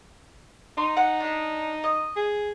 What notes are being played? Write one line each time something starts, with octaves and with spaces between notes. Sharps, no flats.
D#4 C6
F#5
D4 D#5
D#5
G#4